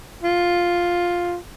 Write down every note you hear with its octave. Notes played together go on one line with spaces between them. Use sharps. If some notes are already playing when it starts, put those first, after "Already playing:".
F4